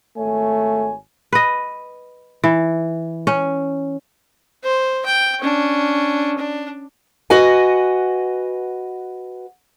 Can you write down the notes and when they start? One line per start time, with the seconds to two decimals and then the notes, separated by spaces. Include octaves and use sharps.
0.16 G#1 A3 C#5 G#5
1.33 B4 D#5
2.44 E3
3.27 C#4
4.63 C5
5.05 G5
5.40 C#4 D4
6.38 D4
7.30 F#4 B4 D#5 F#5 G#5